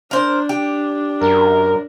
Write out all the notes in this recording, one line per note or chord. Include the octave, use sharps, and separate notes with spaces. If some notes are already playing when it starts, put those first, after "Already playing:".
D4 A#4 C5
G4
F#2 A#4